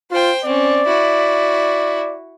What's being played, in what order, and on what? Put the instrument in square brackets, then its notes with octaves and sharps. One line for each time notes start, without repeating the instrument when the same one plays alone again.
[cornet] F4 [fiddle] C5 G5
[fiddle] C4 C#4 [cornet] D5
[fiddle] E4 F#4